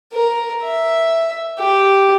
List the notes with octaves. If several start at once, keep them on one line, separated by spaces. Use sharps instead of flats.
A#4
E5
G4